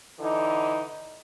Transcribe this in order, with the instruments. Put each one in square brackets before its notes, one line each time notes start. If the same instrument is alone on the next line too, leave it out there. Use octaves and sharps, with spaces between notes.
[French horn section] D3 E3 D#4